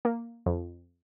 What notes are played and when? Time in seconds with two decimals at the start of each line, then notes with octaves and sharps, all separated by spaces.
0.05 A#3
0.46 F2